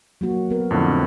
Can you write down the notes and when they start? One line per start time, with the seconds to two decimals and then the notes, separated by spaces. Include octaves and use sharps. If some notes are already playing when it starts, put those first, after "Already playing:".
0.21 F#3 A#3 F#4
0.50 B3 A#4
0.71 F2 A2 D3